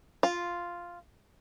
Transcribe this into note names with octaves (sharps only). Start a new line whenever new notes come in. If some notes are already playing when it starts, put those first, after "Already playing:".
F4